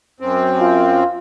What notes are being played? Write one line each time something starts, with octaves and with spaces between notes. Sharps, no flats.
F#2 C4
F4